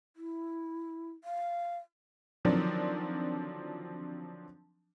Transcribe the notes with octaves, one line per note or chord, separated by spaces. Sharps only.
E4
F5
D3 D#3 F3 F#3 C4 D4